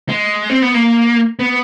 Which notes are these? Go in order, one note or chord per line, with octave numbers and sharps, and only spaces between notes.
G#3
C4
B3
A#3
B3